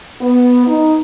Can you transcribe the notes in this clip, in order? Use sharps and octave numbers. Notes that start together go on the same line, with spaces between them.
B3
D#4